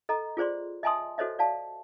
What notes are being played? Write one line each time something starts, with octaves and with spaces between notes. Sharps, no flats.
A4 D#5 A#5
F4 G#4 C5 D5 C6
D#5 E5 G#5 A5 C6 D#6
F#4 A4 C5 C#5 D#5 E5
D5 F5 A5